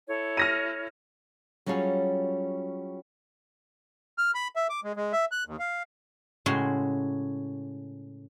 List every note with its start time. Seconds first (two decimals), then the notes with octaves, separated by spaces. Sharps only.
0.07 E4 A4 C#5
0.37 F6 A#6 D#7
1.66 F#3 G3 C#4 F4 G#4
4.18 F6
4.35 B5
4.56 E5
4.70 D6
4.84 G#3
4.96 G#3
5.13 E5
5.31 F#6
5.47 D#2
5.59 F5
6.46 A2 C#3 G#3 F#4 C6